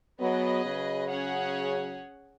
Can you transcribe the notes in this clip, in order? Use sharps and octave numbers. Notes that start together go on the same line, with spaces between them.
F#3 B3 G#4 B4 D#5
C#3 F#3
C#4 G#4 C#5 F#5